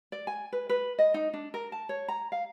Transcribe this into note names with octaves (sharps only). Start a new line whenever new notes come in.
D5
G#5
B4
B4
D#5
D#4
D4
A#4
A5
C#5
A#5
F5